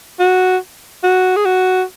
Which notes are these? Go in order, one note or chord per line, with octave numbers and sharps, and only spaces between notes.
F#4
F#4
G#4
F#4